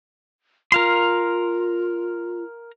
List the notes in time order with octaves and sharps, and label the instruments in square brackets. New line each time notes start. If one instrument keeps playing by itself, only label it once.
[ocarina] F4 [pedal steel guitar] A#4 F5 C6